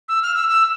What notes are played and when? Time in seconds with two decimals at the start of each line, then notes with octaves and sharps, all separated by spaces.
0.09 E6
0.22 F6
0.35 E6
0.49 E6